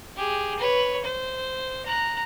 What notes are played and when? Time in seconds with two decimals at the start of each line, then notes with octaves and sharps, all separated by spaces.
0.16 G4 G#4
0.59 B4 C#5
1.04 C5
1.86 A#5 F#6